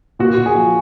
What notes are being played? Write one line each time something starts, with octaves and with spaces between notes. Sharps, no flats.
A#2 F#4
A#2
G#4
F3